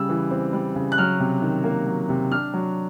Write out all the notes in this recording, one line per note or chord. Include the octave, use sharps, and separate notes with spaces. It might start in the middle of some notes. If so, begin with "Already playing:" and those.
Already playing: C#3 G3 E6
E3
C4
G3
C#3
F#6
F#3 F6
C3
D#3
A#3
F#3
C3
D4 F6
F#3